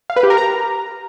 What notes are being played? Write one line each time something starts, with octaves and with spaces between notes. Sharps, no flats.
F5
B4
G4
A#4
A#5